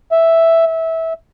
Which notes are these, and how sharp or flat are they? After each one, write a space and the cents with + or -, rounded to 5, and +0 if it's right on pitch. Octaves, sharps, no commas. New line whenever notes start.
E5 +0
E5 -20